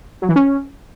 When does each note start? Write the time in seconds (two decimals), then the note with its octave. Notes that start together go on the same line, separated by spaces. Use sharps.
0.22 F#3
0.29 E3
0.36 C#4